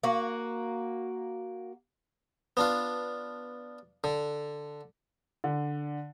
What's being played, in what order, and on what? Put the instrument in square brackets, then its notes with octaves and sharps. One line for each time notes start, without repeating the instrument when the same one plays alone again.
[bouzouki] A#3 F#4
[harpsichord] B3 D4 F4
D3
[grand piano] D3